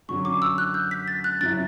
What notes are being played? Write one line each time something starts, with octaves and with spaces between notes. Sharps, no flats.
F#2 D3 F#3 C#4 C#6
D6
E6
F#6
G6
B6
A6
F#6
F#2 C#3 F#3 C#4 E4 A6